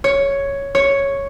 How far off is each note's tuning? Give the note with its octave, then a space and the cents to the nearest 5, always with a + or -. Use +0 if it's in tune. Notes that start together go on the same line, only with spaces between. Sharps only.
C#5 +5
C#5 +0